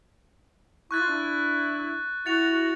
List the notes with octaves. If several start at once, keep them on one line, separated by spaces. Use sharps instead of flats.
E4 C#6 F#6 A6
F4
D4 E4
E4 F#4 A6 C#7 F7